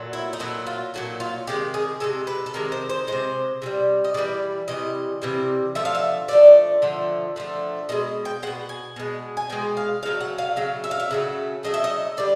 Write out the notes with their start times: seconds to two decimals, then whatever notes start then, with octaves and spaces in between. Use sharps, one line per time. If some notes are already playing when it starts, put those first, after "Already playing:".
Already playing: A#2 F#3 A3
0.13 E4
0.33 D#4
0.39 A#2 F#3 A3 E4
0.67 F4
0.94 A#2 F#3 A3 F#4
1.20 F4
1.47 C3 D#3 G#3 G4
1.74 G#4
2.00 C3 D#3 G#3 A4
2.27 B4
2.46 A4
2.54 C3 D#3 G#3 A#4
2.72 C5
2.89 C5
3.07 D#3 G#3 C5
3.13 C3
3.62 C3 E3 G3
4.04 D#5
4.14 C3 E3 G3 D5
4.68 C3 E3 G3 D#5
5.22 C3 E3 G3
5.75 D3 F3 A3 E5
5.85 F5
5.95 E5
6.28 D3 F3 A3 D5
6.82 D3 F3 A3
7.36 D3 F3 A3
7.89 B2 G#3 D#5
8.25 G5
8.43 G#3 F#5
8.47 B2
8.69 G#5
8.96 B2 G#3
9.37 G#5
9.50 B2 G#3 G5
9.77 F5
10.03 C#3 F#3 A3 F5
10.21 F#5
10.38 F5
10.56 C#3 F#3 A3 F5
10.84 E5
10.91 F5
11.00 E5
11.11 C#3 F#3 A3
11.63 C#3 F#3 A3 D#5
11.74 E5
11.84 D#5
12.17 D3 G3 D5